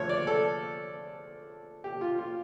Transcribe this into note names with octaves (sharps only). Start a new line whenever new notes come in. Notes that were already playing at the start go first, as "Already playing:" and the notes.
Already playing: D3 F3 A3 C#5
D5
A4
G4
F4
F4